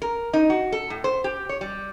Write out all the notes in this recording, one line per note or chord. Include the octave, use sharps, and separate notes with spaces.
A#4
D#4
F#4
A4
A2
C5
G4
C#5
G3